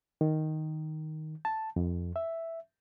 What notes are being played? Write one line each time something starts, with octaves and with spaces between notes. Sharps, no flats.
D#3
A5
F2
E5